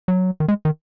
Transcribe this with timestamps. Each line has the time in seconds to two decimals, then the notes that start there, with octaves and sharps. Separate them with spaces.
0.08 F#3
0.40 D#3
0.48 G#3
0.65 D#3